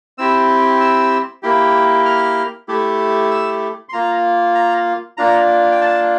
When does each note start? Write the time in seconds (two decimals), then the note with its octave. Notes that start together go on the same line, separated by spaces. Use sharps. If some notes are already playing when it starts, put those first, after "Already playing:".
0.18 C4 E4 G4 E6
0.81 E6
1.43 A#3 E4 G4
2.05 F6
2.68 A3 E4 G4
3.31 E6
3.89 C6
3.93 A#3 F4 A#5
4.55 A#5
5.17 A#3 D4 F4 A#5
5.72 G5
5.81 A5